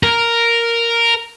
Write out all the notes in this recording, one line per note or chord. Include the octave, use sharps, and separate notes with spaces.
A#4